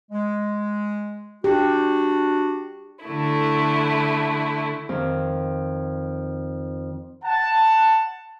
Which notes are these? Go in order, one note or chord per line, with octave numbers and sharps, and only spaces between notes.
G#3
D4 F#4 G4
D3 A3 E4
F2 D#3
F#5 A5